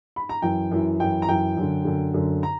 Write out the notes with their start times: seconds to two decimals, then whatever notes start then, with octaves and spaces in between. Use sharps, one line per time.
0.16 B5
0.29 A#5
0.42 F#2 E3 G5
0.71 F#2 E3
1.00 F#2 E3 G5
1.22 A#5
1.28 F#2 E3 G5
1.57 F#2 D3
1.85 F#2 D3
2.14 F#2 D3
2.43 A#5